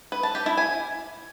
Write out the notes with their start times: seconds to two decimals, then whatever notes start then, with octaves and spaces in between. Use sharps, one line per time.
0.12 B4
0.23 A5
0.35 G4
0.46 E4
0.58 G#5